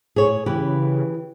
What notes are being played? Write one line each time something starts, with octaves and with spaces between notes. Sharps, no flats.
A2 G#4 C#5
C#3 E3 G4 B4